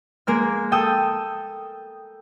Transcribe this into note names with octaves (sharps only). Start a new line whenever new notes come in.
G#3 A#3 A#4 F6
A4 G5 A5 D#6 E6